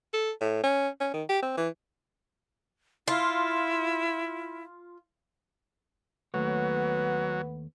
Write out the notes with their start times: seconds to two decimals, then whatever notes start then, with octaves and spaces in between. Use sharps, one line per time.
0.13 A4
0.40 A2
0.63 C#4
1.00 C#4
1.13 D#3
1.29 G4
1.42 C4
1.57 E3
3.08 E4 F4
6.34 D#2 F#3 A3 B3 C#5